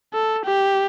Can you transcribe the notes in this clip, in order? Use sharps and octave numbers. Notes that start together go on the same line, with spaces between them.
A4
G4